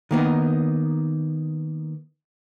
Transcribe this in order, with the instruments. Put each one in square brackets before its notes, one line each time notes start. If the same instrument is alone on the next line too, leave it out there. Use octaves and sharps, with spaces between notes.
[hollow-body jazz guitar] D#3 A#3 B3 D#4